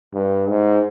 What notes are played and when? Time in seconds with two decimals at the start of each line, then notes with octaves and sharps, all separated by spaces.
0.13 G2
0.49 G#2